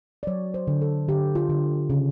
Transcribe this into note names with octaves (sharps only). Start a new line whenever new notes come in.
D5
F#3 C#5
C5
D3
A4
D3 G4
F4
D3
C#3